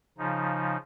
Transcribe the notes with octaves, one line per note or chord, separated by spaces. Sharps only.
C#3 F3 D#4